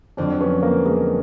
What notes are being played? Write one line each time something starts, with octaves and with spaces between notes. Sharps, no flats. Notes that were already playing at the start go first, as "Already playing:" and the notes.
F2 D3 F#3 C4 D4
B3 C#4
A#3 C4
G#3 A#3